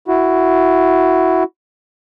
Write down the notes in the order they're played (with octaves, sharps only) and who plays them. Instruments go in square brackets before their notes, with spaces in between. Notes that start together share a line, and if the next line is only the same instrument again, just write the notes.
[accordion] E4 F#4